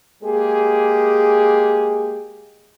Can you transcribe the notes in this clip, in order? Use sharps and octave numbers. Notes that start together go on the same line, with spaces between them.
G#3 A#3 G4 G#4